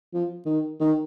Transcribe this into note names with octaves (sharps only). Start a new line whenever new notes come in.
F3
D#3
D#3